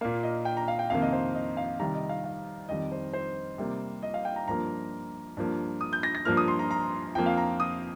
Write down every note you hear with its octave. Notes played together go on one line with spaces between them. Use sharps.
A#2 A#3 F5
D#5
G5
A#5
F5
G5
F2 C3 D#3 A#3 F5
D#5
C5
D#5
F5
C3 D#3 G3 A#5
D#5
F5
F5
F2 D#3 G3 D#5
C5
C5
C3 G3 A#3
D#5
F5
G5
A#5
G2 F3 A#3 A#5
G2 F3 A#3
D#6
G6
A#6
A#6
G2 F3 A#3 F6
D#6
C6
A#5
A#5
F2 F3 A#3 G5
F5
A#5
D#6